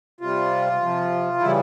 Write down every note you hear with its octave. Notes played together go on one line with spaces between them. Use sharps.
C3 G3 F4
C3 F3
C#3 E3 G3 E4